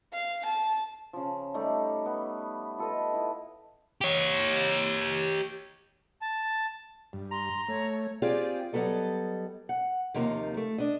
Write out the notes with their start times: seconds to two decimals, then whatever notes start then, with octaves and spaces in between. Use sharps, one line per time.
0.13 F5
0.45 A5
1.13 C#3 F3
1.54 G3 A3 D#4 G4
2.06 B3
2.78 F4 A4 B4 D#5
3.14 E4
4.01 G4 C#5
6.22 A5
7.13 G2
7.31 A#5 C6
7.68 A3 C#5
8.22 C4 F4 G4 G#4 D5
8.73 F#3 G3 B3 A4 D#5
9.69 F#5
10.14 D#2 C3 F3 A#3 D#4
10.57 A3
10.78 D4 D#5